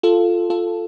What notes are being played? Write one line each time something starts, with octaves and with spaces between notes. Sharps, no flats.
F4 A4
F4 A4